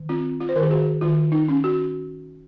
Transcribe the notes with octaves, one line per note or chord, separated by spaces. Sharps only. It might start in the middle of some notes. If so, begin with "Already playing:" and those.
Already playing: D#3
C4 F4
F4
C5
D#3 A#4
G#4
F#4
D#3 F4
D#4
C#4
F#4